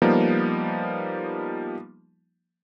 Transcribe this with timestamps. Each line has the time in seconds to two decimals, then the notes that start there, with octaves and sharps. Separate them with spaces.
0.02 F3 G3 A#3 B3 D#4